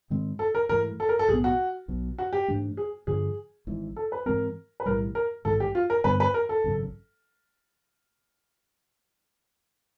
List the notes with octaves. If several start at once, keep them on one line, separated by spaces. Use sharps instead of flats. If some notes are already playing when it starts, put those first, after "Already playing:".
G#2 D#3 G#3 C4
A4
A#4
G#2 E3 A3 A#4
A4
A#4
A4
B1 A2 F#3 B3 G#4
F#4
B1 B2 F#3
F#4
G4
G#2 E3 A3 D4
G#4
G2 D3 F3 G#4
G#1 G#2 E3
A4
B4
G#2 E3 G#3 C4 A#4
B4
B1 A2 E3 G3 A#4
A#4
A1 G#2 D#3 G#3 A4
G4
F4
A#4
G2 D3 G3 B3 B4
B4
A#4
A4
G#1 F#2 C#3